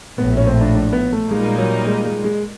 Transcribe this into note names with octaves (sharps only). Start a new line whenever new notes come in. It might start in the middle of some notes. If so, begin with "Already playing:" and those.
A#1 A2 F3 B3
C#4
C4
D4
D4
B3
A3
A#2 G3 G#3 A#3 D#4
F#3
G#3
G#3
G#3